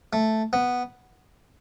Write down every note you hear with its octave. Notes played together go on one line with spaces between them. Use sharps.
A3
B3